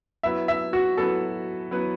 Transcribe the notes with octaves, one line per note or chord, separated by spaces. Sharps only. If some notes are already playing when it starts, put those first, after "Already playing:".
F#3 B3 E4 B4 E5
E5
F#4
F#3 B3 E4 A4 B4
F#3 B3 E4 B4